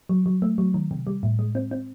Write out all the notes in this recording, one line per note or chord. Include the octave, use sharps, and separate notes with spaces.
F#3
F#3
A3
F#3
D#3
C3
G3
A2
G#3
C4
C4